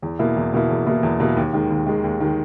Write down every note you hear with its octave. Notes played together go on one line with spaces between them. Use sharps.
E2
B2 A#3 E4
E2
B2 A#3 E4
E2
B2 A#3 E4
E2
B2 A#3 E4
D#2
D#3 G#3
D#2
D#3 G#3
D#2
D#3 G#3